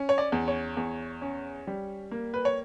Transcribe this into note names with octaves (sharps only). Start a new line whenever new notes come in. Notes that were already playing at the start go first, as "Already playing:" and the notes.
Already playing: C#4
C#5
D5
E2
C#5
E2
C#4
G3
A#3
B4
C#5